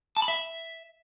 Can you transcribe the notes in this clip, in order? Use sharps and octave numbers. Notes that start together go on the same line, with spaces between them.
A5
B5
E5